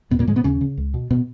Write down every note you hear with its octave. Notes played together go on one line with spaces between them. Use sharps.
D#2 B2 B3
A#2 A#3
G#2 C#3 G#3
B2 B3
D#2 C#3 C#4
C#3
C#2
B2
B2 B3